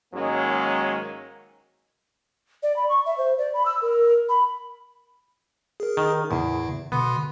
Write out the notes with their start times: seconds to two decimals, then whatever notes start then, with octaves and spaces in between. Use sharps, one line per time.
0.14 G#2 D#3 F#3 G#3 A#3 C#4
2.63 D5
2.76 B5
2.89 C#6
3.06 E5
3.18 C5
3.38 D5
3.54 B5
3.66 E6
3.82 A#4
4.29 B5
5.80 G#4 A#4
5.97 D#3
6.31 E2 A2 C#3
6.92 B2 D3 B3 C6